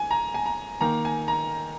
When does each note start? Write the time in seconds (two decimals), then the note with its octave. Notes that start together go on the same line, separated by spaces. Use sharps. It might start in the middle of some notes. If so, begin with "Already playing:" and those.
Already playing: G#5
0.11 A#5
0.34 G#5
0.46 A#5
0.81 D#3 A#3 A#5
1.05 G#5
1.28 A#5